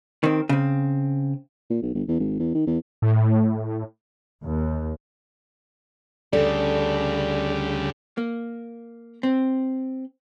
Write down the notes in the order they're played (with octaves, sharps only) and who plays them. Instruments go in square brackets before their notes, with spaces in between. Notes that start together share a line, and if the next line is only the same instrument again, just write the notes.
[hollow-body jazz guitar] D#3 C4
C#3 C4
[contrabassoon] A#2
B1
G1
E2
G#1
E2
D#3
E2
[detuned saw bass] A2
[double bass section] D#2
[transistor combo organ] D2 G3 [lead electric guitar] C#3 [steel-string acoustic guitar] A4 [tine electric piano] D5
[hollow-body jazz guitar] A#3
C4